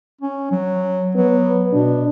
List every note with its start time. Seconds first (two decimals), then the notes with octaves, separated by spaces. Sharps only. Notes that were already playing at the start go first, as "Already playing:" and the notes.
0.21 C#4
0.51 F#3
1.15 F#3 B3
1.73 B2 D4